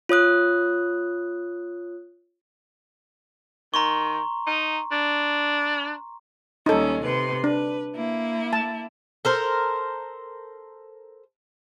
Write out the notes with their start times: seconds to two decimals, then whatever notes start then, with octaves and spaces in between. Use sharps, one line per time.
0.09 F4 C#5 D#6 F#6
3.74 D#3 A#5 C6 C#6
4.47 D#4
4.92 D4
6.66 D#2 G3 C#4 D#4 A4
7.03 C3 B4 C6
7.44 D4 B4
7.95 A#3 E4
8.53 A5
9.25 A4 A#4 C5